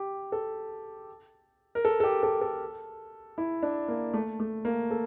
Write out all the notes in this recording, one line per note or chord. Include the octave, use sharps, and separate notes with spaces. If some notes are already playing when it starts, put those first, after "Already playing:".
Already playing: G4
A4
A#4
A4
A4
G4
A4
A4
E4
D4
A#3
A3
A3
A#3
A4